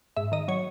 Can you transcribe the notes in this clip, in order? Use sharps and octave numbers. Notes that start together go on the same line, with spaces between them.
G#2 E5
D#3 D#5
F#3 C#5